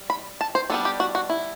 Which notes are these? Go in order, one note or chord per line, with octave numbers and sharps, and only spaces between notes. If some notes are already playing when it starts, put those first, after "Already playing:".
Already playing: G3
B5
A5
C5
G3 B3 D4 A4
G4
F#4
F#4
E4